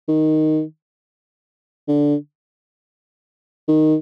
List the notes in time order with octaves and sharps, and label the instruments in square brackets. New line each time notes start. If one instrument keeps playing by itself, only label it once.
[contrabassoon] D#3
D3
D#3